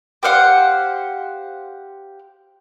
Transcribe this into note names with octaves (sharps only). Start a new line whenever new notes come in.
G4 C5 F5 F#5